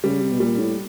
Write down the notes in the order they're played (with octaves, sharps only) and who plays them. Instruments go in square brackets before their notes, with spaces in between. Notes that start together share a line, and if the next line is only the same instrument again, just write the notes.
[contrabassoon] C#3 [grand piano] G3
[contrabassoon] C3
B2
[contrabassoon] A#2 [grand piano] G3
[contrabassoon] A2